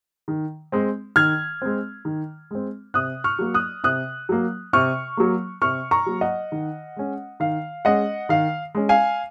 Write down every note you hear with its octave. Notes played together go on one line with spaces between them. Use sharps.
D#3
G#3 C4
D#3 F6 G#6
G#3 C4
D#3
G#3 C4
C3 D#6 F#6
C#6 F6
F#3 A#3
D#6 F#6
C3 D#6 F#6
F#3 A#3
C3 C#6 F6
F#3 A#3
C3 C#6 F6
A#5 C#6
F#3 A#3
D#5 F#5
D#3
G#3 C#4
D#3 F5
G#3 C#4 D#5 F#5
D#3 F5
G#3 C#4
F5 G#5